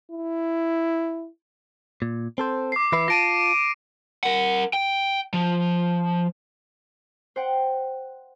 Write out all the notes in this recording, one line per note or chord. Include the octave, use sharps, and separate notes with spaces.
E4
A#2
C4 A4 C5
D6 C7
E3 E4 B4 C7
F4 A5 A#6 D7 D#7
A#4 F#5
G5
F3
C5 F#5 G5